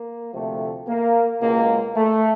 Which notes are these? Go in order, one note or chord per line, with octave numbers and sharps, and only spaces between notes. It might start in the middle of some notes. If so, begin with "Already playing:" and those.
Already playing: A#3
D2 C3 F3 A3
A#3
C#2 B2 G#3 A#3
A3